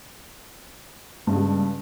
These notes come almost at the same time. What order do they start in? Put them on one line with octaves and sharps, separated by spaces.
G2 C#3 G#3 G3